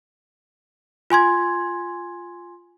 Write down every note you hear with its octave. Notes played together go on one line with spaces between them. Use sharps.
F4 G#5 C6 G#6